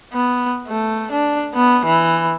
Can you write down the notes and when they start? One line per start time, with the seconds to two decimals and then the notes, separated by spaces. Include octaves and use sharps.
0.13 B3
0.68 A3
1.12 D4
1.54 B3
1.86 E3